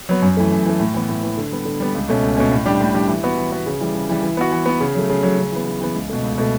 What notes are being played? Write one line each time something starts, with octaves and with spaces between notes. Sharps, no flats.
F#3 B3
F#2
E3 A3
F#2
E3 A3
A2
E3 B3
A2
E3 B3
D3
G3 B3
D3
G3 B3
C#2
B2 A3 C#4
C#2
B2 A3 C#4
A2
G3 D4 G4
A2
G3 D4 G4
E3
B3 F#4 B4
E3
B3 F#4 B4
C#3
E3 G3
C#3
E3 G3
E3
B3 F#4
E3
B3 F#4
C#3
F#3 A3
C#3
F#3 A3
C#3
E3 B3
C#3
E3 B3
C#2
B2 A3
C#2
B2 A3